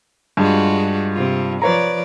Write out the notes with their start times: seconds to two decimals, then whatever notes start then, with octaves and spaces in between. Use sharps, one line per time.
0.37 G2 G#3 F4 F#4
1.13 C3 F4
1.62 F3 B4 C#5 D5 A#5